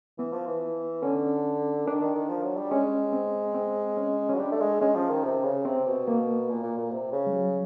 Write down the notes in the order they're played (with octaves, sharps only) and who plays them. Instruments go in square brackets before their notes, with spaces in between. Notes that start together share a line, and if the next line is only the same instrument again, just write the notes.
[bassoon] E3 [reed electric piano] B3
[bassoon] F3
E3
[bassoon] D3 [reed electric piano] C#4
[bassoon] D#3 [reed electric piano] D4
[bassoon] D#3
D#3
F3
F#3
G3
[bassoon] G#3 [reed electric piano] C#4
[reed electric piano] C4
C4
C#4
[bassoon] F#3 [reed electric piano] C#4
[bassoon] G3 [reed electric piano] D4
[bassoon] A3
G#3
[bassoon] G#3 [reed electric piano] C#4
[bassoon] F3
D#3
C3
C#3
[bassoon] C3 [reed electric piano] C4
[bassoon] B2
[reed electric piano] A#3
[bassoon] A#2
A#2
A#2
C3
C#3
[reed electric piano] G3
F#3